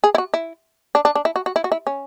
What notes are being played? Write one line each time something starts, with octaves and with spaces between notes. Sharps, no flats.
G#4
E4
F#4
E4
D4
D4
D4
E4
F#4
F#4
E4
F#4
E4
C#4